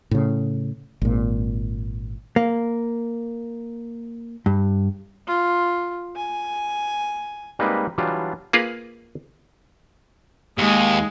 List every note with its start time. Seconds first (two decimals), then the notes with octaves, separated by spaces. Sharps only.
0.11 A2 C#3
1.01 G#1 A#2
2.36 A#3
4.46 G2
5.27 F4
6.16 G#5
7.59 G3 G#3 A#3 C4 D#4 B4
7.98 E3 F#3 G3 D4 F4
8.53 A#3 F4 G#4 A#4 B4
10.58 D#2 G#3